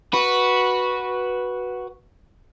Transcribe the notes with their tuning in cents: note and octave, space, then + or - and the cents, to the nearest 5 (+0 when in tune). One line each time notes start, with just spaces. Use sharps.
F#4 +0 B4 -10